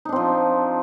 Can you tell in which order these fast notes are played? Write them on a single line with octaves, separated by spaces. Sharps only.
D#4 D4 C4 F3